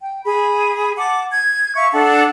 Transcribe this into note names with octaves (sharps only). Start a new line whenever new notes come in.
G5
G#4 B5
F#5 A5 D6
G#6
E5 F5 C#6
D4 A4 F#5 A5